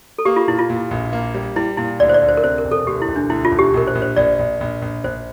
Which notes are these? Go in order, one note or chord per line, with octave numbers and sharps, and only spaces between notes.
A4
A#3 G4
F4
A#2 E4
F4
A#2
A#1
A#3
G3
G3 E4
A#2 E4
D2 D5
C5
D5
D2
C5
A#4
C3 C5
A#4
E1
A4
D2 G4
E4
E1
D4
D2 E4
F4
E1
G4
A#1 A#4
C5
A#1
C5
A#1 D5
A#1
A#1
A#1
A#1 C5